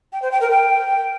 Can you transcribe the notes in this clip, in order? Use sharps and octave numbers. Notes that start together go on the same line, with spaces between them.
G5
C5
G5
A#4
G5